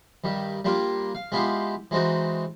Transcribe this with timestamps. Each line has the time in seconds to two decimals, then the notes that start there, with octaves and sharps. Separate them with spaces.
0.24 G2 D#3 G3
0.65 G3 A#3 D4 F4
1.15 F5
1.32 G#3 B3 E4 F4 G4 F5
1.91 E3 G#3 C4 D#4 F#4